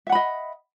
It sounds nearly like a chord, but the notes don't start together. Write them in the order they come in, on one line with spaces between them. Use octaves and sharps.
E5 F#5 B5 D#5